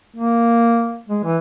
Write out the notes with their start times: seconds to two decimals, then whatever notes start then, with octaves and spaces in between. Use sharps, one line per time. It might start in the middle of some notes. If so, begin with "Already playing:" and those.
0.16 A#3
1.09 G#3
1.24 E3